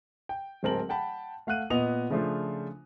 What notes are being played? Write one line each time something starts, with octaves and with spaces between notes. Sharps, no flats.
G5
D1 G#3 C4 A#4 A5 F#7
F#5 G5 A5 B5
A3 F5 F#5 F#6 D#7
A#2 B3 D#5 D#6 F7
C#3 F3 A3 D4 F4 C5